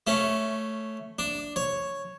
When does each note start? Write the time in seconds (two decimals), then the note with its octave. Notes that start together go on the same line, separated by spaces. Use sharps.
0.07 A3 C#4
1.19 D4
1.56 C#5